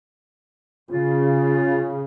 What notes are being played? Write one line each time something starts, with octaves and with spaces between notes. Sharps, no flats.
C#3 F4